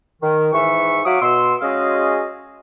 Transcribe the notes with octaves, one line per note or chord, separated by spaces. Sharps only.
D#3
G#2 E3 E5 C#6
F#3 F#4 E5 F5 D6 D#6
B2 C6 E6
G#3 C#4 F#4 G#4 D#5 F5